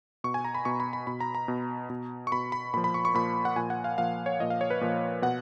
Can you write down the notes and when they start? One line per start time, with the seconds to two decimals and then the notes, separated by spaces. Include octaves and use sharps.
0.24 B2 C#6
0.34 G#5
0.45 A#5
0.55 B5
0.65 B2 C#6
0.80 B5
0.93 B5
1.07 B2 B5
1.20 A#5
1.35 A#5
1.48 B2
1.90 B2
2.27 C#6
2.32 B2 B5
2.52 B5
2.74 A#2 B5
2.77 F3
2.84 B5
2.94 C#6
3.05 C#6
3.15 A#2 F3 B5
3.45 F#5
3.56 A#2 F3 G#5
3.70 F#5
3.84 F5
3.98 A#2 F3 F5
4.26 C#5
4.40 A#2 F3 D#5
4.50 F5
4.61 C#5
4.70 B4
4.81 A#2 F3
5.22 B2 F#5